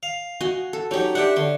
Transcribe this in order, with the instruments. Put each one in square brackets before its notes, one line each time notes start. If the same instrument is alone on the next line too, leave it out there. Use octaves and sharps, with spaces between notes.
[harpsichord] F5
[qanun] F#4 D#5 G#5
A4
[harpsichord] F#3 C#4 [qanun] D#4 G4
[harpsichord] D4 G4 [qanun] C5 E5 F#5
[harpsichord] D3 [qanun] C#5 C6